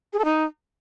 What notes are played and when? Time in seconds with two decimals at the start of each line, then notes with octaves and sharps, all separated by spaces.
0.13 G#4
0.19 A4
0.25 D#4